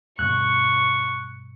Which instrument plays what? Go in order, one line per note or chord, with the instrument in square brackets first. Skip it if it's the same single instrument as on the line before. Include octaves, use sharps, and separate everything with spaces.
[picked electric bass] G2 B2 [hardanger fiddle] C#6 [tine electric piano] F#6